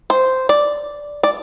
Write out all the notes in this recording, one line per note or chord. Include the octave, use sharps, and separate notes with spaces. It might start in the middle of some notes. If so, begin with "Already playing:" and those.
C5
D5
D5